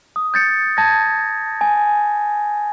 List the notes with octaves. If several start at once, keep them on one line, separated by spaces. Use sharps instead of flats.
D#6
G6 A6 C#7
A5 G#6 A#6
G#5